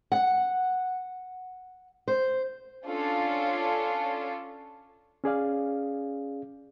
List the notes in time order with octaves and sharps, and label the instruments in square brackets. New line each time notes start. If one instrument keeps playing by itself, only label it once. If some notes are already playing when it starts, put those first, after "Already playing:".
[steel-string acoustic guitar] F#5
C5
[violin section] C#4 D4 F4 A4
[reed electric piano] C#4 G#4 D5 F5